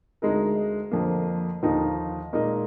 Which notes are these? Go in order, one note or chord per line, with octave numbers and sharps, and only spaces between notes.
D2 D3 G#3 D#4 A#4
F2 D3 F3 A#3
D#2 D3 F3 A#3 D#4
A#2 G#3 D#4 A#4 D#5